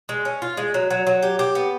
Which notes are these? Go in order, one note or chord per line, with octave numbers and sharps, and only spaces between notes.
G#3
C#4
F4
G#3
F#3
F#3
F#3
G4
G4
B3